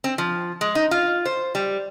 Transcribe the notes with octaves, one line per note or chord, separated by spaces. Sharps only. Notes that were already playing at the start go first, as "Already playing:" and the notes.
C4
F3
G#3
D#4
F4
C5
G3